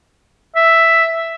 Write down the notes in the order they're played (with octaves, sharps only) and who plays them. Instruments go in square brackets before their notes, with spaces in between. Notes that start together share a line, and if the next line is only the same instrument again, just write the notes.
[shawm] E5